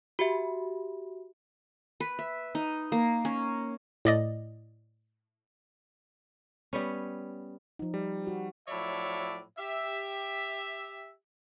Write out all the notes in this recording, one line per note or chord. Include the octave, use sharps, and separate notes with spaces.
F#4 G4 E5
B4
E5
D#4
A#3
C#4
A2 D5 D#5
G3 B3 C#4
F3 D#4
G3
F#4
A2 F3 F#3 C#5 D5 E5
G4 E5